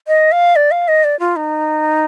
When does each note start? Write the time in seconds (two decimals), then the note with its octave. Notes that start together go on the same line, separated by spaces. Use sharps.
0.07 D#5
0.32 F5
0.56 D5
0.71 F5
0.88 D#5
1.04 D5
1.20 F4
1.36 D#4